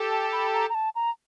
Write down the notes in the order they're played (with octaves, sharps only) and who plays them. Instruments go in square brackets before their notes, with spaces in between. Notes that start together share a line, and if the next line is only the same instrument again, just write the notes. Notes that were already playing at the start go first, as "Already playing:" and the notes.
Already playing: [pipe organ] G4 A4
[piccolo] A5
B5
A#5
A#5
A5
A#5